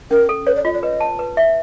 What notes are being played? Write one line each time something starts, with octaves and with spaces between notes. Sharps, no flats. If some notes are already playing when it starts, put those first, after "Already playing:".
C#4 A#4
A4
B4 C#5
D5
F4 D#5
D5
B4 D#5
A5
B4
E5